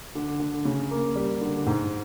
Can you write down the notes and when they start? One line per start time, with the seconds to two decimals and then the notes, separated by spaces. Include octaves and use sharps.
0.15 D3
0.39 D3
0.65 C#3
0.91 A#3
1.16 G3
1.41 D3
1.66 G#2